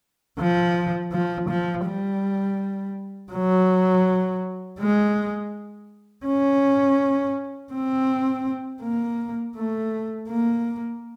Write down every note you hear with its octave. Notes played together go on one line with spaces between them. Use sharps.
F3
F3
F3
G3
F#3
G#3
C#4
C4
A#3
A3
A#3